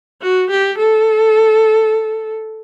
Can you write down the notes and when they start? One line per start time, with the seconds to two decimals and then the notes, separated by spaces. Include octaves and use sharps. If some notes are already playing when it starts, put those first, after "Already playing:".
0.22 F#4
0.50 G4
0.78 A4